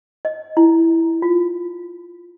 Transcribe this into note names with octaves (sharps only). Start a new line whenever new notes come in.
D#5
E4
F4